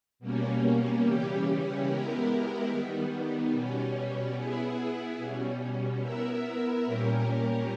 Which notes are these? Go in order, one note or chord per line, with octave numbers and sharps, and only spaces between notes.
B2 G3 A#3 C#4
C#3 E3 G3 C#4 G4
G#3 B3 E4 G4 A#4
D#3 G3 B3
B2 G3 C#4
B3 E4 G#4
B2 G3 C#4
B3 E4 A#4 E5
A#2 G3 C#4 G4 A#4